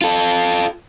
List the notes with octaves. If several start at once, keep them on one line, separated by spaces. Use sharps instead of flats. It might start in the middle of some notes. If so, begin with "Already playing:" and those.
F4 A4